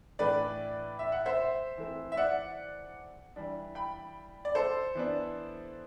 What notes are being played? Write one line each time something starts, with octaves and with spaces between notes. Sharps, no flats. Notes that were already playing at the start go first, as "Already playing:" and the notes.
A2 E3 A3 D4 B4 D5
E5
F#5
C5 E5
E3 A3 C4
E5
D5 F#5
E3 G3 D4
G5 B5
D5
A4 C5
E3 B3 D4